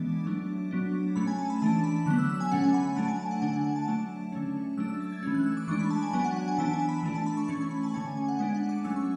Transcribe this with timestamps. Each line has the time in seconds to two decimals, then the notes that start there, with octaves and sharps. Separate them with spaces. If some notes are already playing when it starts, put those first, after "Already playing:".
Already playing: E3 G#3 B3 D4 D6
0.26 F#3 A3 D4
0.71 F#3 B3 D4
1.16 F#3 A3 C#4 B5
1.27 G#5
1.38 A5
1.50 B5
1.62 E3 A3 D4 A5
1.84 B5
2.06 D3 F#3 B3 F#6
2.18 E6
2.29 E6
2.40 G#5
2.51 D3 A3 C#4 F#5
2.64 G#5
2.74 B5
2.85 B5
2.96 F#3 A3 D4 A5
3.08 G#5
3.20 A5
3.31 F#5
3.42 D3 A3 D4 G#5
3.53 F#5
3.65 G#5
3.76 A5
3.88 F#3 A3 D4 A5
4.32 D3 A3 C#4
4.77 F#3 A3 D4 E6
4.88 E6
5.00 A6
5.12 G#6
5.23 E3 A3 C#4 G#6
5.34 F#6
5.46 E6
5.57 D6
5.68 E3 G#3 D4 C#6
5.79 B5
5.90 A5
6.03 G#5
6.13 F#3 B3 D4 G#5
6.24 F#5
6.36 F#5
6.48 G#5
6.58 E3 B3 D4 A5
6.73 G#5
6.89 B5
7.03 E3 A3 D4
7.15 A5
7.26 B5
7.37 C#6
7.48 E3 A3 C#4 C#6
7.61 C#6
7.71 B5
7.83 A5
7.94 D3 A3 C#4 G#5
8.17 G#5
8.28 F#5
8.39 G#3 B3 D4 G#5
8.55 F#5
8.69 D6
8.84 F#3 A3 C#4 E6
8.96 C#6